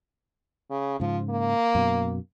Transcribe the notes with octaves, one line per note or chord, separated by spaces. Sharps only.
C#3
G#2 C#3 F3
A#3
F#2 B2